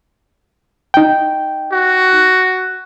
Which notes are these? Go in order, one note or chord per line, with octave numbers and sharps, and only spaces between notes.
D#4 G5
F#4